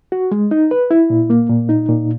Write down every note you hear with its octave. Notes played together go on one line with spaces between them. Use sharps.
F#4
G#3
D#4
B4
E4
A#2
A#3
A#2
D#4
A#2